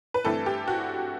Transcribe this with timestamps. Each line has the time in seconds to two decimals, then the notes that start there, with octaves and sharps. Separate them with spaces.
0.14 B4
0.24 G2 E3 A3 C4 A4
0.46 G4
0.68 F#4